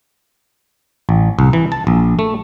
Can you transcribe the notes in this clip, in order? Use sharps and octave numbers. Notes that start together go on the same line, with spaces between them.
A1
C2
E3
A5
A#1
A3